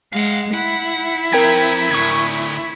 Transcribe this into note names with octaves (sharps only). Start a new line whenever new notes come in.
G#3 F5 F#5
E4 F#5
F3 C4 A#4 G5 G#6
D2 A2 C#6 G#6